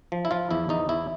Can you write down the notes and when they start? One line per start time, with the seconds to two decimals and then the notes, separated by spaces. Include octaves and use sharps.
0.12 F3
0.25 E4
0.31 F3 F4
0.51 E2 E4
0.69 E2 D#4
0.89 E2 E4